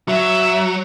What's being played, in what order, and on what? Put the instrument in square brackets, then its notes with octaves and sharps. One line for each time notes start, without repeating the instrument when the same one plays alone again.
[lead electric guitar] F#3 [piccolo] E5